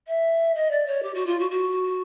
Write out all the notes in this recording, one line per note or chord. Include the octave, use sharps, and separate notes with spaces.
E5
D#5
D5
C#5
G4
F#4
F4
F#4
F#4